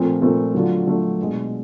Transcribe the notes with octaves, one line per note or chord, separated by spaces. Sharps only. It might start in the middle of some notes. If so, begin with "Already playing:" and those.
Already playing: A#2 F3 A3 C4
A#2 F3 A3 C4
D3 F#3 A3 D4 F4
D3 F#3 A3 D4 F4
B2 G#3 B3 D4